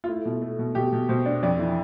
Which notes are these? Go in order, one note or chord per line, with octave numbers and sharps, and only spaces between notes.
F4
A3 E4
B2
A3
B2
B2 G4
B2
B2 C5
D4
F2 D5
E3